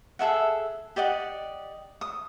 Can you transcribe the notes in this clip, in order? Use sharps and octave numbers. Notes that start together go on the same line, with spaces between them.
G#4 A4 E5 F#5
G4 D5 D#5 F#5
D#6